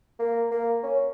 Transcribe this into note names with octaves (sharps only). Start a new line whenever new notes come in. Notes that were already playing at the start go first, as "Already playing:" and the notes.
A#3
A#3
C#4